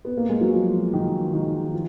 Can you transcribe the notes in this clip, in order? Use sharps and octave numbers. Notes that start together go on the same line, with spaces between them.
B3
A#3
G#3
F#3
F3
D#3
D#3
F3